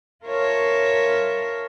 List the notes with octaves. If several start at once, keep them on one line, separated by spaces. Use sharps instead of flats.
F4 A#4 C#5 E5 A5